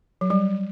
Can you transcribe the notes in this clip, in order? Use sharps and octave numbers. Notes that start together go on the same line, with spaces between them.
F#3
G3